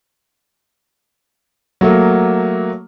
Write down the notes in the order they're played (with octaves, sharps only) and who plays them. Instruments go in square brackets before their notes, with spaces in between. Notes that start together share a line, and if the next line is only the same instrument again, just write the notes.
[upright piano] F#3 A3 A#3